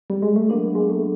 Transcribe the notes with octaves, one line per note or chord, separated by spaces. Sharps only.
G3
G#3
A3
F#3 A#3 B3 D4
G#3
A3